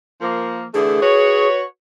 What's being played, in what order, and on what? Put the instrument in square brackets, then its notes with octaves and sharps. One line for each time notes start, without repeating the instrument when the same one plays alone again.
[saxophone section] F3 A#3
[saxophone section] D3 E3 A3 [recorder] G#4
[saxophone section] F#4 B4 C#5